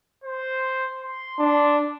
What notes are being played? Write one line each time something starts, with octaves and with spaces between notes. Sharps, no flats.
C5
C6
D4